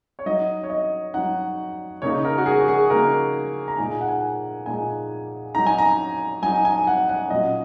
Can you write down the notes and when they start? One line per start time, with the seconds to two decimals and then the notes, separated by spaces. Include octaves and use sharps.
0.19 C#5
0.26 F#3 D#4 D#5
0.63 C#5
0.70 D#5
1.14 F#3 D#4 F#5
2.02 C#3 A#3 D#4 C#5
2.25 A#4
2.38 F#4
2.46 G#4
2.61 F#4
2.68 G#4
2.90 C#3 A#3 D#4 A#4
3.68 A#5
3.78 A#2 G#3 D#4 G#5
4.01 F#5
4.08 G#5
4.66 A#2 G#3 D#4 G#5
5.55 F#3 D#4 A#5
5.66 G#5
5.78 A#5
6.42 F#3 D#4 G#5
6.65 G#5
6.87 F#5
7.09 F#5
7.30 A#2 F#3 C#4 D#5